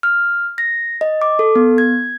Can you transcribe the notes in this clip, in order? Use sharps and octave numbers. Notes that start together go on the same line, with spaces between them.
F6
A#6
D#5
D6
A4
B3
G#6